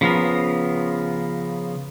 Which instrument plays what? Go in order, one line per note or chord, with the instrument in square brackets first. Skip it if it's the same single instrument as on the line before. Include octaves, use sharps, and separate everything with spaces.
[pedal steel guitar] C#3 F3 B3 A#4